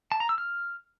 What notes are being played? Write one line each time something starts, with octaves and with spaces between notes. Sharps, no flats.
A5
A#5
E6
F6